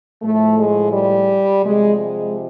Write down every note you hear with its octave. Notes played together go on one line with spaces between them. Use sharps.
A2 F3 A3
G#3
G3
C3 F3 G#3
G#3